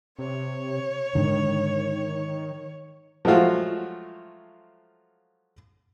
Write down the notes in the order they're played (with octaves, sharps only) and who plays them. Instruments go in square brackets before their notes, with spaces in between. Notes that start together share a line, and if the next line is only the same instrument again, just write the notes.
[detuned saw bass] C3 [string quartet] C#5
[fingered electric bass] G#2 D3 [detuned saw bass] D#3
[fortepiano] F3 F#3 G#3 A3 F4 F#4